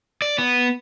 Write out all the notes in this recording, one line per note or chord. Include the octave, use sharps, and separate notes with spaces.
D5
B3